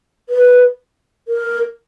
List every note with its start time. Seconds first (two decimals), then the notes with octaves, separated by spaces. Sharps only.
0.29 B4
1.28 A#4